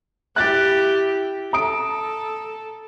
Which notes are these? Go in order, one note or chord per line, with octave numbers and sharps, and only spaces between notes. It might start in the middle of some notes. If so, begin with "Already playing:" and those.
E4 G4 F#6 A6
A4 A#5 D#6 D7